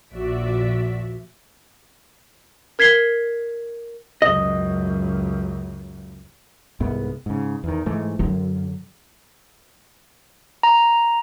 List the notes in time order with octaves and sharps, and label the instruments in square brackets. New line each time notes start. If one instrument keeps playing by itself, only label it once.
[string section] A#1 D#2 F3 F#4 D5 E5
[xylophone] A#4 G#6 B6 C7 G7
[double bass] C#2 F#2 [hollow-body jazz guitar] D#5
[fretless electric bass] C2 G#2 B3
G#2 C#3
E2 D#3
G#2 E3 A3
[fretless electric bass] F#2 [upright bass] D3 F#3
[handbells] A#5